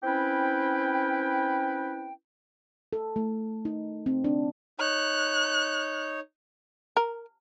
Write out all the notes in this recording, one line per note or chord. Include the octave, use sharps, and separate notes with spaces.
C4 C#4 E4 B4 G5
A4
A3
D#4
C4
D4
D#4 C#5 F#6
A#4